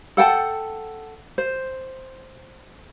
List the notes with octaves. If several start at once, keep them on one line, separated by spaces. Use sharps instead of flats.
A4 F#5 G5 A5
C5